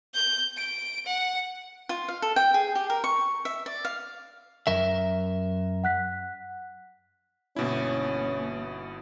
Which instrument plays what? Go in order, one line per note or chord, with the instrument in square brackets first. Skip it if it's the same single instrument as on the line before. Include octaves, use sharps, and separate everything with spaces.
[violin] G6
D7
F#5
[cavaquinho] F4
F5
A4
G5
G#4
G4
A#4
C#6
E5
D5
F5
[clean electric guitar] F#2 A#4 E5
[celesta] F#5 F#6 B6
[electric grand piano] G1 B2 E4 [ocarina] A#3 [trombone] C#4